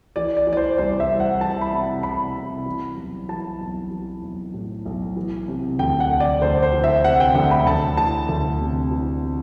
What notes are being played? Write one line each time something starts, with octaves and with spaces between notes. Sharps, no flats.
E3 D5
D5
E3
D5
C5
C2 C5
E5
C2
F#5
E3 A5
B5
C3
A5
C3 B5
C3
E3
B1
E3 A5
B1
E3
B1
A2
B1
E3
C3
D2 G5
F#5
D2
D5
D2 C5
C5
E3
E5
C3 F#5
G5
D2 F#5
B5
D2 A5
E3 A5
D2
C3
E3
C3